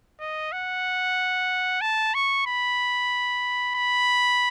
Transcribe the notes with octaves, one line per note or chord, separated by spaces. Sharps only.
D#5
F#5
A5
C#6
B5
B5